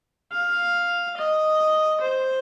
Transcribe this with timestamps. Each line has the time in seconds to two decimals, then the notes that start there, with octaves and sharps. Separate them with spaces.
0.33 F5
1.17 D#5
2.01 C5